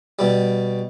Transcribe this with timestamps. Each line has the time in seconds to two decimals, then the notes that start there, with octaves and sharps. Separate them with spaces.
0.19 B2 G3